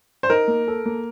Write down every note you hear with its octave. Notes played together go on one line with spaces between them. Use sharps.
C5
D#4 A#4
A#3
A4
A#3